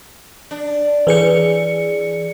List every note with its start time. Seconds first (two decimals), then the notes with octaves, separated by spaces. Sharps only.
0.51 D4
1.07 E3 G#4 B4 C#5 C#7